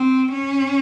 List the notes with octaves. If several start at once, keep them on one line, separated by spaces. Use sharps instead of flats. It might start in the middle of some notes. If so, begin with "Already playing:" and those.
Already playing: C4
C#4